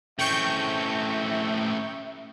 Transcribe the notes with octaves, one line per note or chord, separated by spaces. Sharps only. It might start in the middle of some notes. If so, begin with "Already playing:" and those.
A2 A3 C4 C#4 E5 G5 C#6 G6